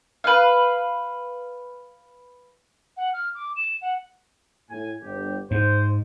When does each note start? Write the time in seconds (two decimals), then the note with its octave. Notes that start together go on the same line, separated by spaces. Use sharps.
0.24 B4 F5
2.97 F#5
3.13 F6
3.35 D6
3.56 E7
3.81 F#5
4.70 A2 G#5
5.03 G1 G4
5.51 G#2 C5